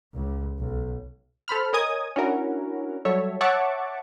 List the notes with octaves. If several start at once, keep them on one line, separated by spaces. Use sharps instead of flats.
C#2
B1
A4 C5 B5 F6
A#4 C#5 D#5 G#5 D#6 G#6
C#4 D4 E4 F#4 A#4
F#3 G3 A4 C#5 E5
C#5 E5 F#5 A5 C#6 D6